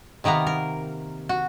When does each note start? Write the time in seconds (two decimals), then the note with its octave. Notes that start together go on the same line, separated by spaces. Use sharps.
0.24 C3 D#3 A#3 B3 A#5
0.47 A#4
1.29 F#4